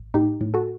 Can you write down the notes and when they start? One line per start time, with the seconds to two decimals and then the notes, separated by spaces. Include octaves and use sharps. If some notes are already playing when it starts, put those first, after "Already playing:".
Already playing: A1
0.14 A2 D#4 G4
0.41 A2
0.54 F#4 A4